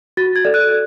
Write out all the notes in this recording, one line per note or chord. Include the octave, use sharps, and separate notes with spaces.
F#4 A6
G#6
A4 D5
F#6